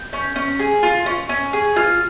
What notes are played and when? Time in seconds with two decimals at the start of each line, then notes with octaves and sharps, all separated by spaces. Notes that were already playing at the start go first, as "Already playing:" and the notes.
Already playing: G6
0.13 C#4
0.36 C#4
0.59 G#4
0.83 F4
1.06 C#4
1.29 C#4
1.53 G#4
1.76 F4 F6